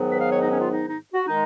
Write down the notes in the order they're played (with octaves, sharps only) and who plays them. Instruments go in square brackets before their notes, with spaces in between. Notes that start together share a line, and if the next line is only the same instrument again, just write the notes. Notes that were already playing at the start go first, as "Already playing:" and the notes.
Already playing: [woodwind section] G#2 D#3 F#3 B3
B4
F5
C#5
D#4
C#4
F4
D#4
D#4
F#4
D#3 G#3 D#4